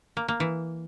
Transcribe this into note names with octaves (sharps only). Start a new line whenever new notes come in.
A#3
A#3
E3